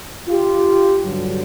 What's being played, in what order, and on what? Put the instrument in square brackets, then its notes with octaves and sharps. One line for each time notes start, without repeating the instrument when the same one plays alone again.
[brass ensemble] F4 G4
G2 D3 F#3